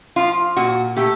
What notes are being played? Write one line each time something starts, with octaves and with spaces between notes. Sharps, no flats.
F3 F4
A#2 F#4
A3 G4